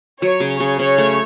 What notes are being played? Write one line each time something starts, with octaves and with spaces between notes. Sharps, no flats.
F#3 C#5
C#3
C#3
C#3 C#5
A3